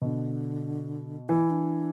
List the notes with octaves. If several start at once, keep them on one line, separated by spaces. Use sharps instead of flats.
B2 D3
E3 E4
D4